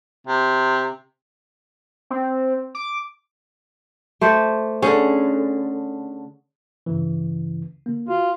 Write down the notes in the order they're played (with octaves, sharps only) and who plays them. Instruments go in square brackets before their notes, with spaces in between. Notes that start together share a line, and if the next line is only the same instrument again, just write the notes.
[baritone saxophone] C3
[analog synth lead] C4
D6
[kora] A3 C5 D5
[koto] D3 G#4 [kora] C#4
[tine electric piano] G2 C#3 E3
D3 A#3
[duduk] F4 [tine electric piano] F#4